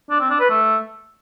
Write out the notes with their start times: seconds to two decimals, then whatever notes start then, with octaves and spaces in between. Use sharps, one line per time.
0.10 D4
0.20 C4
0.30 D4
0.40 B4
0.50 A3